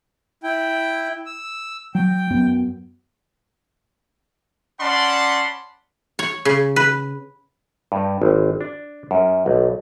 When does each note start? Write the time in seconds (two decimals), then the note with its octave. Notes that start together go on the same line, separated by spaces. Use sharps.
0.43 E4 G5
1.26 E6
1.95 F#3 G5
2.30 F#2 F#3 B3
4.79 C#4 D5 F#5 A5 B5 C6
6.19 C#5
6.45 C#3
6.76 B4
7.92 G2
8.22 G#1
8.61 D4
9.11 F#2
9.46 B1